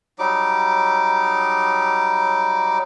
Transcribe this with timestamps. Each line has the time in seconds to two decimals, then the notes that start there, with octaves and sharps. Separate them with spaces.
0.19 F#3 G3 D#4 D6